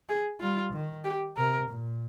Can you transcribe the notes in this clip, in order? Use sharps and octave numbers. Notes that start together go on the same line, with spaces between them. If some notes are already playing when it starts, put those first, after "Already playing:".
G#4
G3 F4
D#3
G4
C3 A#4
A#2